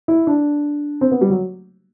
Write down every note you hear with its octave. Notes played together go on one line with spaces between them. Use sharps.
E4
D4
C4
B3
G3
F#3